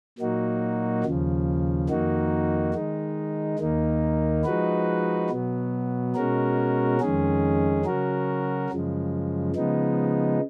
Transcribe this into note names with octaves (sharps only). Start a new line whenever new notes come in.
A#2 F#3 A#3 D#4 F#4
D#2 C#3 F3
F2 D#3 A#3 D#4 F#4
D#3 G#3 D#4
D#2 D#3 A#3 D#4
F3 G#3 D#4 F#4 B4
B2 F#3 B3
B2 G#3 C#4 F#4 A#4
F2 D#3 G#3 C#4 G#4
C#3 F#3 C#4 F#4 A#4
F#2 C#3 F3 G#3
C#3 F3 G#3 B3 D#4